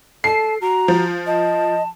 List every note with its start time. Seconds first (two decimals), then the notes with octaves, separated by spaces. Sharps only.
0.24 A4 A5 C7
0.61 F#4 A#5
0.88 F3
1.27 D#5 A5